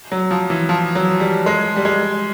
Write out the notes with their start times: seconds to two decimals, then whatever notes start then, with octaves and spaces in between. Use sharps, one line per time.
0.12 F#3
0.31 F3
0.50 E3
0.69 F3
0.95 F#3
1.20 G3
1.46 G#3
1.76 G3
1.85 G#3